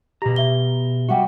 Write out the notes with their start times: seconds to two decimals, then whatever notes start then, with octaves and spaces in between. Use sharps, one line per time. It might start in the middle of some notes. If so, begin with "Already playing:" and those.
0.22 B2 G4 A#5
0.36 G4 E5 G7
1.09 G3 F#4 E5 F#5 G5